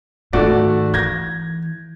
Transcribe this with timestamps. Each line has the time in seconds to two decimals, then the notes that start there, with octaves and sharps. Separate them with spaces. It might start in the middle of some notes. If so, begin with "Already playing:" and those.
0.33 G#2 D#3 A3 F#4 D5
0.94 E3 G6 G#6 A#6